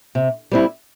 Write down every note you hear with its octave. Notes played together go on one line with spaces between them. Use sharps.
C3
G3 C4 E4